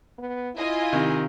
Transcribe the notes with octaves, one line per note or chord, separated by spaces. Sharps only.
B3
E4 F4 D#5 G#5
C3 D#3